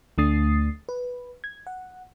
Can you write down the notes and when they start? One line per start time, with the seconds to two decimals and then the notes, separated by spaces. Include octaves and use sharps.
0.18 D2 A3 D4 D#6 A6 C7
0.89 B4
1.44 G#6
1.67 F#5